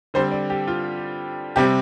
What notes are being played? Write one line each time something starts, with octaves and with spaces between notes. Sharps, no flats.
D3 G3 C4 C5
D5
G4
F4
C3 G3 C4 G4